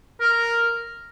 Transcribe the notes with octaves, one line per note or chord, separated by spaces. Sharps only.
A#4